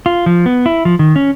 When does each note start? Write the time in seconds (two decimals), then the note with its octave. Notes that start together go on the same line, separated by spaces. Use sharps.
0.06 F4
0.26 F3
0.46 B3
0.66 E4
0.85 F3
0.99 D#3
1.16 C#4